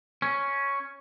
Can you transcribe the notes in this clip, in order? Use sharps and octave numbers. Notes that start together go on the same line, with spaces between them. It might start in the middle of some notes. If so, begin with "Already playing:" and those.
C#4